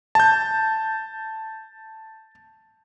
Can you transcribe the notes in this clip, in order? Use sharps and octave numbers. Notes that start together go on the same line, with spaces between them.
A5 G6